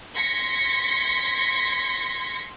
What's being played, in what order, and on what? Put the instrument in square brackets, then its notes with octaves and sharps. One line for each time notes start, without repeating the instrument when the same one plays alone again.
[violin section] C6 G#6 A#6 B6 C#7